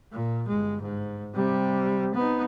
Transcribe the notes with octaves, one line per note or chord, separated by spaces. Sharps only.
A#2
G1 G#3
G#2
C3 G3
B3 D#4